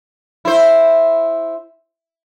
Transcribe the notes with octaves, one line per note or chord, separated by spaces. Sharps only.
E4 C5